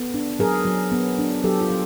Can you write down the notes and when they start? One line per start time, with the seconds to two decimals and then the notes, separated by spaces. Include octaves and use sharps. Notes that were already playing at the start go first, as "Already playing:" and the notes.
Already playing: B3 A4
0.14 D4
0.39 F#3 G#4 A#4
0.65 F#3
0.92 B3
1.19 D4
1.44 F#3 G4 A4
1.61 F4
1.70 F#3